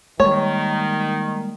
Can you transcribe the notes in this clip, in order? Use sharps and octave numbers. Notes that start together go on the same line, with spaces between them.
D#3 G3 G#3 A#3 C#5